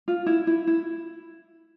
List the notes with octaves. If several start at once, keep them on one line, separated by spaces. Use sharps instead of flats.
F4
E4
E4
E4